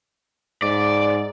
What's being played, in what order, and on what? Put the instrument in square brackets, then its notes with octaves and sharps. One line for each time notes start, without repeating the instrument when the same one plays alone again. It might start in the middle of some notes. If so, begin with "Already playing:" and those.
[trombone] G#2 [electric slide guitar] D5